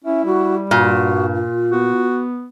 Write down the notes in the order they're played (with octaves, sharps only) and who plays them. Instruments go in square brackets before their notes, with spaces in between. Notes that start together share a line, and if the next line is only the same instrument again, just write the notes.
[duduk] C#4 [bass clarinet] E4 [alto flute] E5
[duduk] G3 [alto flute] F#4
[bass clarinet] G2 [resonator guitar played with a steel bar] A#2 [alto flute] F#4
[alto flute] F4
[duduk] B3 [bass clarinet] F#4